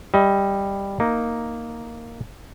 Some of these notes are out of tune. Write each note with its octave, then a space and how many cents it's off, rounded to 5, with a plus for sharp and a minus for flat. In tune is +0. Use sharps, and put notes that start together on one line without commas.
G3 +10 D#5 +30
A#3 +0 D#4 +0